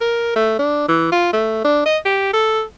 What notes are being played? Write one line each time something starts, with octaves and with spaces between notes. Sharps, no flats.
A#4
A3
D4
E3
F4
A3
D4
D#5
G4
A4